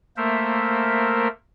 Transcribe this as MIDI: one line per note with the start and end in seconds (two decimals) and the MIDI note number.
0.17 1.28 57
0.17 1.28 58
0.17 1.28 70
0.17 1.28 72
0.17 1.28 76